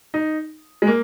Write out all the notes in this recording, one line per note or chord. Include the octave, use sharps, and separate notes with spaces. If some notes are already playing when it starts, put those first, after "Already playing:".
D#4
G#3
A#3